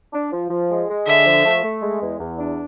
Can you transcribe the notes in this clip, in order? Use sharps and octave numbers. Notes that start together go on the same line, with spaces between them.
D4
F3
F3
G#3
G#3
D3 E5
F3
A3
A3
G#3
E2
E2
D4